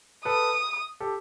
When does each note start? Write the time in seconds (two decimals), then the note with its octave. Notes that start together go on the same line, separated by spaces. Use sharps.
0.25 A4 B4 D#6
1.00 G4 A4